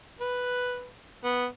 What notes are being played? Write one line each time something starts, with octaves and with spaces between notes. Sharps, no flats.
B4
B3